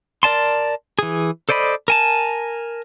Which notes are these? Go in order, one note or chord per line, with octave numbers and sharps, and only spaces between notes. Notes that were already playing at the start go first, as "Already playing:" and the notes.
A#4 D5 A5 C6
E3 G#4
A4 C5 D5 D#5 B5
A#4 G#5 A5